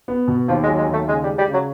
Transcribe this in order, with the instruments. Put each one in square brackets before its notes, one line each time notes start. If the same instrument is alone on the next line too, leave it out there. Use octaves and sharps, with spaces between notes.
[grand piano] B3
B2
[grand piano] D#2 [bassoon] F3
[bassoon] G#3
[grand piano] F#3
[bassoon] G#3
[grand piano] D#2
[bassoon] A3
[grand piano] C#3 [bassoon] G#3
[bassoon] G3
[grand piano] G#3
[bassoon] G3
[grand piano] C#3
[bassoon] F#3